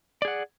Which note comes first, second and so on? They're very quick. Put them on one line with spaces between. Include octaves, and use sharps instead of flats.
D5 G#4 F#5